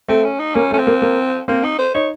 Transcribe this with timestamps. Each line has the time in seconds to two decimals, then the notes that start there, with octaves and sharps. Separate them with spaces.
0.08 A3 C4
0.24 C#4
0.40 D#4
0.55 A#3 C#4
0.71 A3
0.73 C#4
0.78 C4
0.87 A#3
1.02 A#3
1.48 A#3 C4
1.64 D#4
1.78 C5
1.94 D#4 C#5